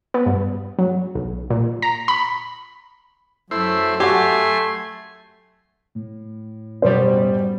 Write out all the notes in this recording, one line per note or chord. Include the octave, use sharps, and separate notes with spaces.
B3
G2
F#3
B1
A#2
A#5
B5
F#2 F#3 A3 E4 C5
A3 F#4 G4 G#5 C6
A2
F#2 B2 G3 C5